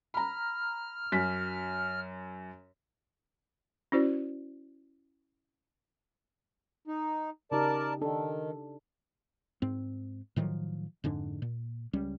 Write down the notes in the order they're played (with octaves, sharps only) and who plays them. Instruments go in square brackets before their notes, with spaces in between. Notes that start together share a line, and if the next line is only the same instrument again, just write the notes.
[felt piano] A#5 B5 [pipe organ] F6
[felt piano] F#2 B6
[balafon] C#4 E4 F#4 C5 D5
[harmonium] D#4
[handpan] C#3 D#4 G4 [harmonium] A#4 D5 A5
[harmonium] D#3 [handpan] D4 A4
[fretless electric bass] G#2 C4
A2 D#3 F3 F#3
F2 G#2 D3 D4
A#2
C#2 G3 C#4